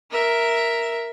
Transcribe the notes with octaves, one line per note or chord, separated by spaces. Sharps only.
A#4 E5